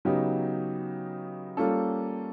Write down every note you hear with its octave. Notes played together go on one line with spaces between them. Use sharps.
C#3 F#3 B3 D#4 G4
G3 A#3 C#4 F4 A4